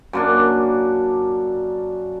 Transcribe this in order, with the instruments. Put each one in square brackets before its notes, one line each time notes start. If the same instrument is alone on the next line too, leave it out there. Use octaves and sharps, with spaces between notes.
[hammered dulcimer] F#2 A#3 D4